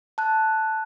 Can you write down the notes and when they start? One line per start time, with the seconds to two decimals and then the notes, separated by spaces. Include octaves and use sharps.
0.18 A5 F#6